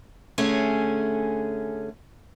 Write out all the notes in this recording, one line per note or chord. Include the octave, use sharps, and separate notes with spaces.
D3 A3 C#4 G#4